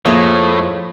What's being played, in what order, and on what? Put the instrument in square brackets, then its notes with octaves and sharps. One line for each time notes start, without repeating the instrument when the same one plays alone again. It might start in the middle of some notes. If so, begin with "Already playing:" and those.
[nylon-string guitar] F2 [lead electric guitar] A2 A3 [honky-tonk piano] A#3 [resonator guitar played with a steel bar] G#4 C#5 E5